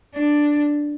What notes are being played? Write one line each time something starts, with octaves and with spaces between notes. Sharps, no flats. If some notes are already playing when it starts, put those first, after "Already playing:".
D4